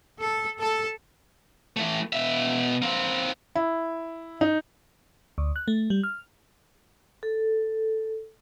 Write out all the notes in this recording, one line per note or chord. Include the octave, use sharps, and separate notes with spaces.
A4
A4
E3 A3
B2 E5
A#3 C4
E4
D#4
D2
F#6
A3
G3
F6
A4